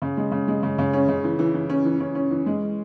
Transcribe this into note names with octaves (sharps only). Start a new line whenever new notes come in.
C#3
G#3
C#3
G#3
C#3
C#3
C#4
C#3
E3
E3
E3
C#4
E3
C#4
C#4
E3
G#3